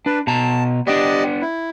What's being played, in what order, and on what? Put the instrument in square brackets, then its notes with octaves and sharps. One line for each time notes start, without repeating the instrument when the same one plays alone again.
[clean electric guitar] D4 [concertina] B4
[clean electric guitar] B2 A#5 [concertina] A5
[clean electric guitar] B3 D4 [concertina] G4 D5 D#5
[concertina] E4